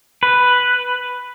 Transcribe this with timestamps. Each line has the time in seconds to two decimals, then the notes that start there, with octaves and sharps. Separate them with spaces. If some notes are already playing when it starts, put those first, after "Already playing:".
0.23 B4